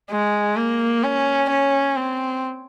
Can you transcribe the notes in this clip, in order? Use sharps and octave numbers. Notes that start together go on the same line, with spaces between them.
G#3
A#3
C#4
C#4
C4